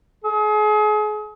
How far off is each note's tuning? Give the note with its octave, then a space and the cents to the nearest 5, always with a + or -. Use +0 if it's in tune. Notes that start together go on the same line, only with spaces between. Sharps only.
G#4 +35